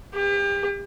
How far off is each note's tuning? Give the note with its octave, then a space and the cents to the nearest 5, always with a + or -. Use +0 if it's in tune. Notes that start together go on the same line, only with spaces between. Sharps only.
G4 +35